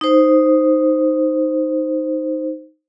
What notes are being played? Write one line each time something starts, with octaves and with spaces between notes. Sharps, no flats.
D#4 C5